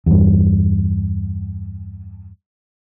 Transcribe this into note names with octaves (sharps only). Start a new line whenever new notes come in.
E2 G2